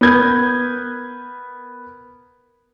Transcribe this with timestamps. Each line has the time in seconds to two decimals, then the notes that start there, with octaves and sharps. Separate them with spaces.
0.01 B3 A#4 B4 G6 G#6